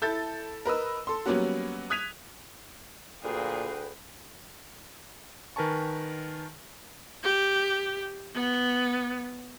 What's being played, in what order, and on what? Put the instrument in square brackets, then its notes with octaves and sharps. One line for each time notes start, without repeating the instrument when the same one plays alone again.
[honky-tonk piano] E4 A4 G6 A6
A#4 B4 D#5 E6
A4 C6
F#3 G3 A#3 B3 C#4 F#4
D#6 F#6 G#6 B6 D#7 F7
[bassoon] D2 [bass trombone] A#2 [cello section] F#4 G#4 F5 [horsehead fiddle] B4 G5
[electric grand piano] D#3 A#4 B4 G#5 A5 C#6
[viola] G4
B3